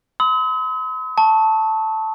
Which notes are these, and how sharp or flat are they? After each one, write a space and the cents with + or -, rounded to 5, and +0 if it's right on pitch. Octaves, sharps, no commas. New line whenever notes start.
C6 -45 D#6 +45
A5 +0 C#6 +0